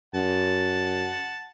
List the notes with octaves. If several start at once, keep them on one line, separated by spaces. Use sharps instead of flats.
F#2 F#5 A5